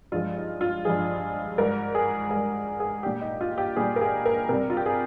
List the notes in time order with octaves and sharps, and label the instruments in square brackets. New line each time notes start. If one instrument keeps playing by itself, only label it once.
[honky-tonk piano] G2 F3 G#3 F4
D#4
F4
G2 F3 G#3 G#4
G#2 G3 A#4
G#4
G#2 G3 G#4
G#4
A#2 G3 G4
D#4
F4
G4
A#2 G3 G#4
A#4
G#4
A#4
C3 G3 A#4
F4
G4
G#4